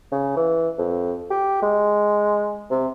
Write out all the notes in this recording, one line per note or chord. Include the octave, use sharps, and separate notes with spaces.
C#3
E3
F2
G4
G#3
C3